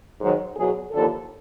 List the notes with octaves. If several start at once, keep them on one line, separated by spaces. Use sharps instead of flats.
G#2 D#3 F#3
E2 B2 F#3 G#4
D#2 D3 F3 A4